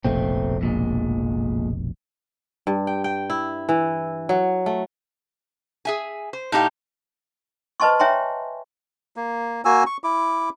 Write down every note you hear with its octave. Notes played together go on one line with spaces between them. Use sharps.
F1 A#1 B2 A3 C4
F2 A#2 G#3
G2
G5
G5
E4
E3
F#3
A3
G#4 E5 G#5
C5
A2 D#4 G4 F5
B4 C5 D#5 A5 C6 C#6
C#5 E5 G5 G#5 A#5 C6
A#3
A#3 F#4 G#5 E6
C#6
E4 D6